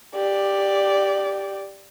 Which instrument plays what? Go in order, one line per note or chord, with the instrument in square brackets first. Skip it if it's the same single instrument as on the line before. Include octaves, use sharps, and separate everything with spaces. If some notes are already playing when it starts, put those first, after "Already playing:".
[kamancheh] G4 D5